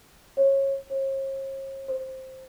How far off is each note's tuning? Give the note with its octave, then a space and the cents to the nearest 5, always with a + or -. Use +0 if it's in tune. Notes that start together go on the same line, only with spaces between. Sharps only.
C#5 -25
C#5 -45
C5 +5